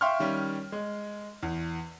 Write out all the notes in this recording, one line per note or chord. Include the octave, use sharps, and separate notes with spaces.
E5 F5 G5 C6 C#6 F6
D#3 G3 C#4
G#3
E2